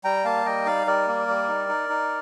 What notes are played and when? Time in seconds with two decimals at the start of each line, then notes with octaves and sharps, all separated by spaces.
0.04 G3 G5 A#5
0.24 A#3 F5 A5
0.46 G3 D#5 G5
0.66 D#4 D5 F5
0.87 G3 A#4 D5
1.07 A#3
1.28 G3
1.48 D#4
1.69 D#4
1.89 D#4